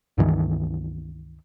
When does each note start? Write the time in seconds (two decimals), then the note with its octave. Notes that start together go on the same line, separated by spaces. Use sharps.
0.18 C#2 G2 D#3 E3